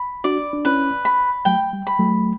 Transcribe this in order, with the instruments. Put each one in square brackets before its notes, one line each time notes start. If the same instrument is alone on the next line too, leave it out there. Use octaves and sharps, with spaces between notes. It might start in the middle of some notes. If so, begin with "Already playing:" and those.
Already playing: [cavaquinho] B5
[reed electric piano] D4 F#4 [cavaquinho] D5
[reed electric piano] D4
[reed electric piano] C#4 E4 [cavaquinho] B4
[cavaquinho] B5
[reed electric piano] F#3 A3 [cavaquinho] G5
[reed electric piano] G3
[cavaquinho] B5
[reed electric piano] F#3 A3